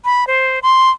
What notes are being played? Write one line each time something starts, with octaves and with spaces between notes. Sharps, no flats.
B5
C5
C6